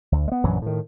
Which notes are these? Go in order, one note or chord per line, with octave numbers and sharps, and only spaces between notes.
D2
G#3 B3
A#1 F#2 E3 F#3
A2 D#3